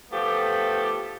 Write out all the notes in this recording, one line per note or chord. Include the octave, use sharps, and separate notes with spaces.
F3 A3 B3 G4